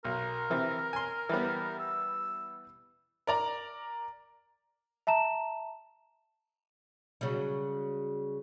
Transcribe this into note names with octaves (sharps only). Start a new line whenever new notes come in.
B1 A#4
C3 E3 C4
G#5 C6
E3 G3 B3
E6
A#4 D5 A#5
E5 A5 A#5 E7
C#3 F#3 G3